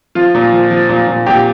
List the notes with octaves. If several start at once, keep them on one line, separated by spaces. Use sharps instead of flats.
F3 F4
A#2
F3
F3
A#2
A#2
A#2 G4